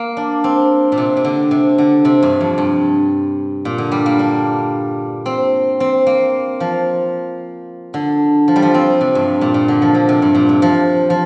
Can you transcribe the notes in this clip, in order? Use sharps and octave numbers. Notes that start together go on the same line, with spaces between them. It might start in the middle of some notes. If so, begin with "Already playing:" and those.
Already playing: A#3
D4
C4
A#2
C3
C3
D3
C3
D3
C3
G2
F2
G2
A#2
D3
G3
A#3
D4
C4
C4
A#3
F3
D3
F3
G3
F3
C4
C3
G2
A#2
A#2
D3
F3
D3
C3
G2
A#2
C3
F3
F3